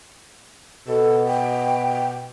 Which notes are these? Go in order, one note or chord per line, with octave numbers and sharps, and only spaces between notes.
B2 A4
G5